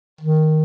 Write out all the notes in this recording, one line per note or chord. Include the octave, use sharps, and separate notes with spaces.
D#3